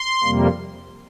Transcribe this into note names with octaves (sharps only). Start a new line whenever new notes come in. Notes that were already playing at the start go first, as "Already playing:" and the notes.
Already playing: C6
F2 C3 G3 A#3